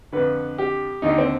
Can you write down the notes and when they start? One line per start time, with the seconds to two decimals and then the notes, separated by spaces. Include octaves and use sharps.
0.12 F2 D3 B4
0.58 G4
1.02 D#2 D3 D#4
1.18 C4